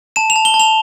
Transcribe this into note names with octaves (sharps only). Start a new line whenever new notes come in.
A5 E7
F7
A5
G7
A5
F7